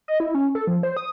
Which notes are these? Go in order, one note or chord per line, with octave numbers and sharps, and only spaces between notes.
D#5
E4
C#4
A4
F3
C5
D#6